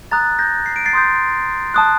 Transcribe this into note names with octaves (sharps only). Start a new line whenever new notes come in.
A#5 D#6 F#6 A6
G6 A#6
C7
D7
A6 C7
C6 D#6 G6
A5 D#6 F#6